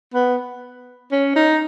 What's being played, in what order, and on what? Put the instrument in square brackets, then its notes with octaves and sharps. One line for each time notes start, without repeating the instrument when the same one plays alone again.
[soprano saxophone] B3
C#4
D#4